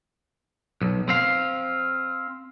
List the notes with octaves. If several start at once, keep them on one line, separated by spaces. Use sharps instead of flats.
B1
C4 F5